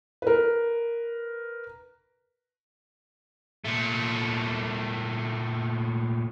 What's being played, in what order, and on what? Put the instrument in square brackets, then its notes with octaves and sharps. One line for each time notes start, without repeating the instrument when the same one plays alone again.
[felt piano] A#4 B4
[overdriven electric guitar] A#2 A3